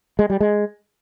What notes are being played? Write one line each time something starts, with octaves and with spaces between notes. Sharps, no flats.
G#3
G3
G#3